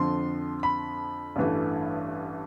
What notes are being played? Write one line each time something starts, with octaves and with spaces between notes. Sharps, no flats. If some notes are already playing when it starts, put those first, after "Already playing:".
Already playing: F2 D3 F3 C6
B5
A1 G2 E3 A3